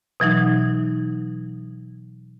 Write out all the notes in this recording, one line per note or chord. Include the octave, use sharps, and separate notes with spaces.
B2 E3 F#3 D#4